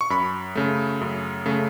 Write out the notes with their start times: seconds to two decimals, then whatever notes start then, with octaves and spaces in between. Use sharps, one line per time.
0.01 C#6
0.10 F#2 B5
0.55 C#3 A3
1.01 F#2
1.46 C#3 A3